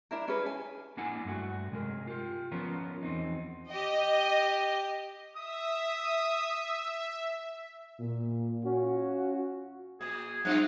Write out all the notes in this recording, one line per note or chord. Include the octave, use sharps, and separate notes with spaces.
D4 E4 A#4
C#4 G#4 B4
G#5
A#3 D4 E4 F#5 G#5
G2 A3 F#4
C3 G#3 A#4
F4 G4
F3 B3 C#4 F4 A#4
E2 C4 D#4
G4 D#5
E5 D#6
A#2
C#4 F4 F#4
A#2 G#4
G2 C4 F4 F#5